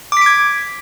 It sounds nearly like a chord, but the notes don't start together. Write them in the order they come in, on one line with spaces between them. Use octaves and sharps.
D6 B6 D7 G#6